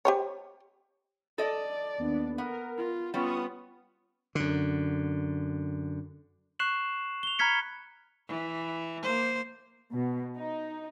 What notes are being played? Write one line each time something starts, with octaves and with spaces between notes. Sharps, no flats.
G4 C5 C#5
A4 D5 D#5
D#2 B3 D4
B3 A#4
F4
G3 B3 C#4 F4 C#6 D#6
F#2 D3
C#6 F#6 C7 E7 F#7
F7 G7
A#5 B5 F6 G#6 B6 C#7
E3
A#3 C5
B2
D#4